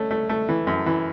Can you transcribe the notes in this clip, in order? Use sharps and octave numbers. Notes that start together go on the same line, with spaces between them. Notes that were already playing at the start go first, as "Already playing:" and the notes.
Already playing: A3 C#4
A3
A3
E3
F#2
E3